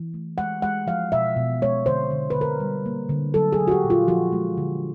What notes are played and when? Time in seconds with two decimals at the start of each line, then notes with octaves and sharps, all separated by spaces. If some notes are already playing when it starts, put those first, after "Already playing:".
Already playing: E3
0.14 A3
0.38 G#3 F#5
0.62 G#3 F#5
0.87 F3 F5
1.12 B2 E5
1.36 B2
1.62 G#3 C#5
1.86 D3 C5
2.11 D3
2.30 B4
2.36 D3
2.41 A#4
2.60 G3
2.86 A#3
3.09 D3
3.34 F#3 A4
3.53 G#4
3.60 F#3
3.68 F#4
3.71 G4
3.84 A#2
3.90 F4
4.08 F3 F#4
4.32 G#3
4.58 D3